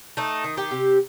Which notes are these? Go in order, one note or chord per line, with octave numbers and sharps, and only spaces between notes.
A3 D#4
D#3
G4
C3